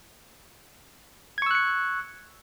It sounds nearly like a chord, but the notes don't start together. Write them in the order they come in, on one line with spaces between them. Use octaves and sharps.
G#6 C#6 E6 F#6 C#7